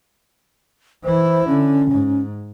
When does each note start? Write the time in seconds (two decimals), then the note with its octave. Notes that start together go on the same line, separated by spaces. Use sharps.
1.04 E3 E4 C5
1.47 D3 C#4
1.91 G#2